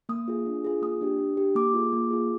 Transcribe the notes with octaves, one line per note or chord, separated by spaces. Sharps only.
A#3 D#6
F4 G#4
D4
F4 G#4
A#3 D#6
D4 G4
D4
G4
A#3 D6
F4 G#4
A#3
F4 G#4